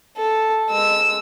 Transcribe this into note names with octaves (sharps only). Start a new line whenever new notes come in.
A4
G#3 E6